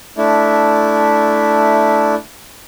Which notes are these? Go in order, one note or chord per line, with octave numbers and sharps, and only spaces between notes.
A3 D4 E4